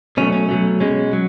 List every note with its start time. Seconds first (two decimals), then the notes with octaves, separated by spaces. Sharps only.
0.17 B2 F#3 A3 C#4
0.32 C#4
0.48 B2 F#3 A3
0.80 B2 G#3 C#4
1.13 F#3